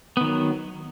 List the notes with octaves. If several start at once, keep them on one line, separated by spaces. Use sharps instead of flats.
D#3 F#3 B3